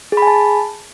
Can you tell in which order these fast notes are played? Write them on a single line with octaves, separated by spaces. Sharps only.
G#4 B5 G#5 A5